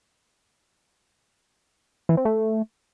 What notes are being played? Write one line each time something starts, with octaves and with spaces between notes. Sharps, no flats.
E3
C4
A3